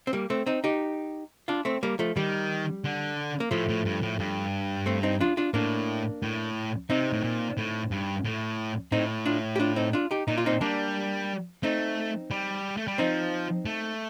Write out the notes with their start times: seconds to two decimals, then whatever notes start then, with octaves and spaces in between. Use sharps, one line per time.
0.07 C4
0.13 G3 A#3
0.30 A3 C4
0.46 C4 D#4
0.64 D#4 G4
1.48 D4 F4
1.65 A3 C4
1.83 G3 A#3
1.99 F3 A3
2.17 D#3 G3
2.84 D3
3.40 A#3
3.51 A2 F3 A3
3.69 A2
3.85 G2
4.02 A2
4.19 G2
4.86 A3 C4
5.03 C4 D#4
5.21 D4 F4
5.37 D4 F4
5.54 A2 A#3 D4
6.22 A2
6.90 C3 C4 D#4
7.13 A2
7.23 A#2
7.57 A2
7.91 G2
8.24 A2
8.92 A2 C4 D#4
9.26 D4 F4
9.56 G4
9.60 D4 F4
9.76 C4 D#4
9.93 D4 F4
10.11 D#4 G4
10.28 A#2 D#4
10.38 F4
10.46 C4 D#4
10.61 G3 A#3 D4
11.63 A3 C4 D#4
12.31 G3
12.77 A3
12.87 G3
12.98 F3 C4 D#4
13.66 A3